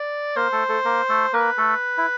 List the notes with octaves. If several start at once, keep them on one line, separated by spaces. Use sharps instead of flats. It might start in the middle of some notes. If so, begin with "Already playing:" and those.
Already playing: D5
A#3 A#4 C5
A3 A4
A3 A4
A#3 A#4
A3 A4
A#3 A#4 B4
A3 A4
E4